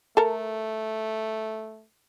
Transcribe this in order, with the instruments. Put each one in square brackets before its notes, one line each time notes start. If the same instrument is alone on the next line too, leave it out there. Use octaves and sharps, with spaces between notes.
[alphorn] A3 [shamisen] A4 A#4